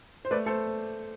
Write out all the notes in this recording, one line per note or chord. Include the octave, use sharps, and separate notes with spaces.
C5
A3 B4 D5
A3 A4 C5